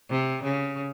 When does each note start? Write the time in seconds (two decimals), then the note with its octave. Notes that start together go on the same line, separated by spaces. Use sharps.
0.10 C3
0.44 C#3